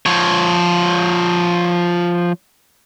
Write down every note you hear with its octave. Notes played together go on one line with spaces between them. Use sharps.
F3 C#5